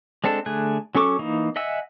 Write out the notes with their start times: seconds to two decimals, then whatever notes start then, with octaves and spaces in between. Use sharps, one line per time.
0.24 G#3 C4 D4 A4
0.46 D3 A3 G#4 G#5 F#6
0.95 F#3 C#4 A4 C#6 D6
1.19 E3 A#3 D#4
1.56 D#5 E5 F#5 G#5 E6